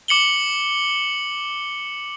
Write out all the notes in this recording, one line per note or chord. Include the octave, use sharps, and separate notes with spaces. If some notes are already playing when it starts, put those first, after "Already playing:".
D6 C#7 F#7 G7